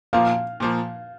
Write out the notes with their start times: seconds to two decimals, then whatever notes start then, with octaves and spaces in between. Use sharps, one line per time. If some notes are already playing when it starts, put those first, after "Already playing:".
0.13 A#2 F3 A#3 F5
0.60 A#2 F3 A#3